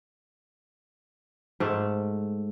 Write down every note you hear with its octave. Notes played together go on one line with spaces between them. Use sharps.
G#2 A3